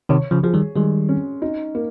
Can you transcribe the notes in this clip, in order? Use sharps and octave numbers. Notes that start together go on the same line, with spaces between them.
C3 D#3 C#5
C#3 F3
F3 G#4
D#3 G3
D#3 G3 G#3
C#4
D#4
A#3